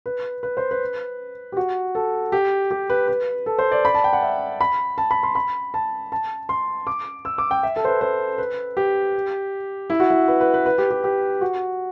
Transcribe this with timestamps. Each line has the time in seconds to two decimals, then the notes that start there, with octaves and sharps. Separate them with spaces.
0.06 B4
0.43 B4
0.57 C5
0.71 B4
1.52 G4
1.57 F#4
1.95 A4
2.32 G4
2.71 G4
2.90 B4
3.08 B4
3.46 A4
3.59 C5
3.71 D5
3.85 B5
3.95 A5
4.04 G5
4.13 F#5
4.22 E5
4.61 B5
4.98 A5
5.11 B5
5.23 C6
5.35 B5
5.74 A5
6.12 A5
6.49 C6
6.87 D6
7.25 E6
7.38 D6
7.51 G5
7.63 E5
7.76 A4
7.85 C5
7.88 B4
8.01 C5
8.38 B4
8.77 G4
9.90 E4
10.00 F#4
10.10 E4
10.28 B4
10.41 B4
10.54 B4
10.66 B4
10.78 G4
10.91 G4
11.04 G4
11.41 F#4